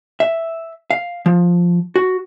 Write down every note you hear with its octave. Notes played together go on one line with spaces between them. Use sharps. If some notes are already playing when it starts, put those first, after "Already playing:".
E5
F5
F3
F#4